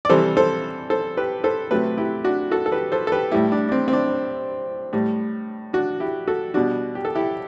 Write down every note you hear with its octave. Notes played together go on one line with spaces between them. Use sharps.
D5
C3 E3 G3 A4 C5
A4 C5
A4 C5
G4 B4
A4 C5
C3 F#3 A3 G4 B4
E4 G4
D4 F#4
F#4 A4
A4
G4 B4
A4 C5
A4
G4 B4
A2 G3 E4 G4
D4
D4
C4
C4
D4
A2 G3
D4 F#4
E4 G4
F#4 A4
B2 G3 D4 F#4
G4
A4
E4 G4